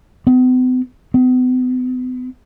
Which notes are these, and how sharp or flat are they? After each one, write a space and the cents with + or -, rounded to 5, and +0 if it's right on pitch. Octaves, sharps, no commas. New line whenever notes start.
B3 +45
B3 +40